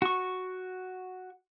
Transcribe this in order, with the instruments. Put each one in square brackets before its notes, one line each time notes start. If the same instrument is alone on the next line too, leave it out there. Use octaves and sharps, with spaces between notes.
[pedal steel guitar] F#4 C#6